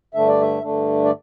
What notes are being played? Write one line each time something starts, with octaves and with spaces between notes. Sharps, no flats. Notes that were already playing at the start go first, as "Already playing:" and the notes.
G2 D3 A3 D4 E5
D5
E5
G2 D3 A3 D4
D5